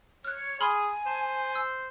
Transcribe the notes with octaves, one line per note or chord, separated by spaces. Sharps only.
C#5 F6 F#6
G#4 G#5 B5 C6 F6
C5 A5
E6